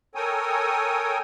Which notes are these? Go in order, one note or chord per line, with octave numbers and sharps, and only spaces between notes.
A4 A#4 C#5 G5 G#5 D#6